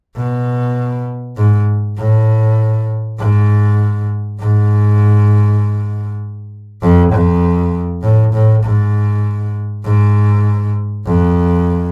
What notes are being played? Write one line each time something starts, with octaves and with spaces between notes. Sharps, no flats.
B2
G#2
A2
G#2
G#2
F2
F2
A2
A2
G#2
G#2
F2